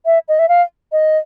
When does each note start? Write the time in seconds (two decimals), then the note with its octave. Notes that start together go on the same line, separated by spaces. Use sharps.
0.06 E5
0.28 D#5
0.39 E5
0.49 F5
0.92 D#5